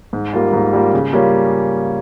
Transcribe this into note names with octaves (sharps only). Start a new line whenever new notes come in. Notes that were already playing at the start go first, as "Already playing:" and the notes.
G#2
G3 A#3 F4
G#2
G3 A#3 F4
C#3
G3 A#3 C#4 F4